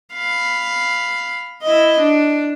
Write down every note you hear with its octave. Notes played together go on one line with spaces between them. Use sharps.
F5 B5
E4 D#5
D4